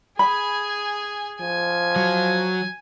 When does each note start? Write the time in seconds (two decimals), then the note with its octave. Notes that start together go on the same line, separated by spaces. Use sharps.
0.19 G#4 G#5 B5
1.41 F3 G#5
1.96 F#3